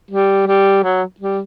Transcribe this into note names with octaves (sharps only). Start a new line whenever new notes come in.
G3
G3
F#3
G3